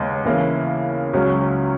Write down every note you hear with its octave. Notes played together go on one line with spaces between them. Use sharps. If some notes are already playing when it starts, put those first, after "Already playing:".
Already playing: D#2 C#3 G#3 B3
C#3 E3 A#3 E4
C#2 C#3 F#3 C#4